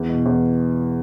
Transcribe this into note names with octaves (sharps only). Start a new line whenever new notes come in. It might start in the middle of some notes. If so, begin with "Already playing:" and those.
Already playing: E2
B2
E2